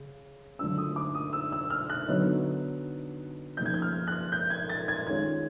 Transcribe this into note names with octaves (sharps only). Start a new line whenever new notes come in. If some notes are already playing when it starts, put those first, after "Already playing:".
Already playing: C#3
D3 F#3 A3 D4 F4 E6
D#6
D6
D#6
E6
E6
F6
F#6
D3 F#3 B3 D#4
C#3 F3 A#3 D#4 G6
G#6
G6
F6
F#6
G6
G#6
A6
G#6
D#3 G#3 C#4 F4 G#6